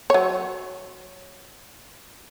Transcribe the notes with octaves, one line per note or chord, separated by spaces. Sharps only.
F#3 C#5